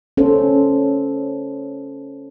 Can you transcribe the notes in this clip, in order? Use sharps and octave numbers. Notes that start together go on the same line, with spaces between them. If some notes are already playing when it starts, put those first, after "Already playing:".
C#4 A4 C5